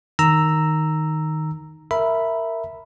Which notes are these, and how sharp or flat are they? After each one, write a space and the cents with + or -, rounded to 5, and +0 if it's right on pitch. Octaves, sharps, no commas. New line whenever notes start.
D#3 +0 A#5 -5 E6 +0
A#4 -15 E5 +0 B5 +0